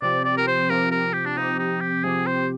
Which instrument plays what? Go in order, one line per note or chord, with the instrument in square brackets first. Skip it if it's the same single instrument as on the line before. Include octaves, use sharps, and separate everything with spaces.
[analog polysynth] C3 F3 C4 G4 [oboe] D5
[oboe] D5
A#4
C5
[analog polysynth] C3 F3 C4 G4 [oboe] A#4
[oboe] A#4
G4
D4
[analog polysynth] C3 F3 C4 G4 [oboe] D#4
[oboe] D#4
G4
[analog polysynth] C3 F3 C4 G4 [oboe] G#4
[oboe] C5